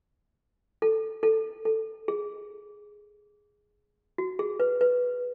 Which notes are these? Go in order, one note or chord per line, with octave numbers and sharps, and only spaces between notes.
A4
A4
A4
G#4
F#4
G#4
B4
B4